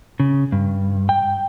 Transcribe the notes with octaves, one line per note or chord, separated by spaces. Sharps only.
C#3
G2
G5